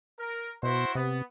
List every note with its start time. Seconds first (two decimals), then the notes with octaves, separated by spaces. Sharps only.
0.19 A#4
0.63 B2 E4 F#4 C5
0.95 C3 B3